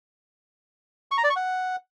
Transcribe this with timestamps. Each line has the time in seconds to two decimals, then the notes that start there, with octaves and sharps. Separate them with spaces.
1.11 C#6
1.18 A#5
1.24 D5
1.30 C#6
1.36 F#5